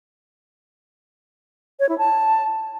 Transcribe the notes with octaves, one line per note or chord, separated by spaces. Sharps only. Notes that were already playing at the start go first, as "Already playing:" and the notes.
C#5
E4
A5